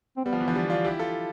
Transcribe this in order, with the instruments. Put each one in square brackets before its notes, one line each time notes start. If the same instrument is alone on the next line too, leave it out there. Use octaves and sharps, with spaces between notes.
[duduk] C4
[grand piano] G3 [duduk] B3
[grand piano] F3
E3
D3 F3
E3 G3
D4 F4
E4 G4
F4 A4